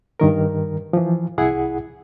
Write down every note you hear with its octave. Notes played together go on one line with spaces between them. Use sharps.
G2 D#3 A#4
E3 F3
C2 E4 G#4 F#5